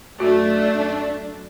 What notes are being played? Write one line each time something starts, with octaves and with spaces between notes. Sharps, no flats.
F#2 A3 D4 F#4